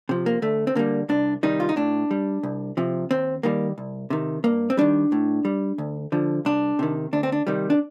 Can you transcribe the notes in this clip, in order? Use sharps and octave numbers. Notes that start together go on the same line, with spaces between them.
C3 F3
A#3
D2 A3
C4
D3 G3 A#3
C2 D4
C3 D#3 G3 D#4
F4
D#4
A2 D4
G3
C2
C3 F3
D#2 C4
D#3 G3 A#3
C2
C3 D#3
G2 A#3
C4
D#3 G3 D4
A2
G3
D2
D3 F3
C2 D4
C3 D#3
D2 D4
C4
D4
C3 D#3 G3
D4